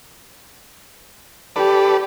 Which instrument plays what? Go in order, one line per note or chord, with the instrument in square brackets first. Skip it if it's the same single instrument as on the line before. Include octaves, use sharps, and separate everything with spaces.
[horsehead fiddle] G4 [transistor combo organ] A4 B4 D5